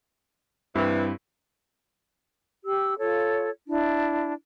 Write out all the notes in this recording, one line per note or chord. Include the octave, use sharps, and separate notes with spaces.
G2 C3 E3 C4 E4
G4 E6
F4 A4 C#5
D4 E4